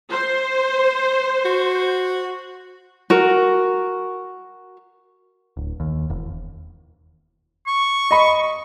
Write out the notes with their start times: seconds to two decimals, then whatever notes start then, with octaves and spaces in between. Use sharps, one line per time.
0.11 C5
1.45 F#4
3.10 F#4 A#4
5.57 D1
5.80 D#2
6.10 E1
7.67 C#6
8.11 D#5 B5